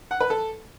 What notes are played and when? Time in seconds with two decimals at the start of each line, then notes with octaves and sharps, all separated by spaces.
0.11 F#5
0.21 B4
0.30 A4